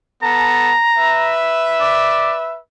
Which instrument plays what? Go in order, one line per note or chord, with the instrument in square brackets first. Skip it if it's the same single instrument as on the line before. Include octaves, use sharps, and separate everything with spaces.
[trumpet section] B3 A4 A5 [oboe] A#5
[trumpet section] B4 E5
[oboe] D5